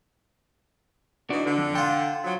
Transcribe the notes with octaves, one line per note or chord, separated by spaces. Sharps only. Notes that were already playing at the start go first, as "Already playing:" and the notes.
E3 D4 D#4 F#4
D3
F2
F4 G5 A5
F3 F#3